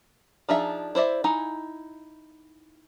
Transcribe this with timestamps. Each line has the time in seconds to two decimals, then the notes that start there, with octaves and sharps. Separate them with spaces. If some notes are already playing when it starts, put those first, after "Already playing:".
0.49 F3 D4 D#4 G#4 E5
0.95 E4 C5 D5 E5
1.24 D#4 E4 F#5 G#5 A#5